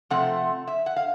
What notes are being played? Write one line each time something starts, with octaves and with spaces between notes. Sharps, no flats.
C3 F3 A3 C4 F#5
E5
F#5
F5